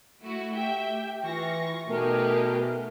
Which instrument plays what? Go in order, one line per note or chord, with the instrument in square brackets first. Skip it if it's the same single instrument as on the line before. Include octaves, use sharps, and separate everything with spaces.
[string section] A3 E4 F#4
[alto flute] G4 [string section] E5 G5
[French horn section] E3 [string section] F4 C#6 A#6
[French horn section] B2 [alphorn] A3 [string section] D#4 G4 G#4 [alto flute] A#4